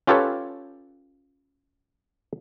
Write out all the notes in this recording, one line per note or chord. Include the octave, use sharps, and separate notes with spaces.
C#4 F4 G4 A4 B4 C#5